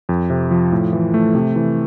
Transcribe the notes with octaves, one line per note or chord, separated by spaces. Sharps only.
F2
C3
F3
A2
E3
A3
C3
E3